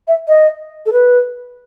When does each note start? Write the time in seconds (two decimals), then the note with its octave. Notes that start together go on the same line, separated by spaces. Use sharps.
0.08 E5
0.28 D#5
0.86 A4
0.93 B4